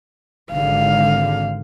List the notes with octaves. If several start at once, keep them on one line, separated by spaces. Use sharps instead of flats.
G#1 D3 F5